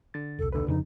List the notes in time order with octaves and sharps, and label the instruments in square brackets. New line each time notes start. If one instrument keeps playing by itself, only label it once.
[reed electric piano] D3 A6
[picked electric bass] E1 C2 [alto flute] A4
[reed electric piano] D#2 D3 B4 [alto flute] A4
[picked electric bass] F2 C#3 [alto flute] D#4